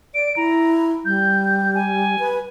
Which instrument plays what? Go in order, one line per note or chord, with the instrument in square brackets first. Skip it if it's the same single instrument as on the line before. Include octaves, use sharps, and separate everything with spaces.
[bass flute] D5 [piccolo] D7
[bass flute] E4 [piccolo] A#5
[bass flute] G3 [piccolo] G6
[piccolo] G#5
[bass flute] B4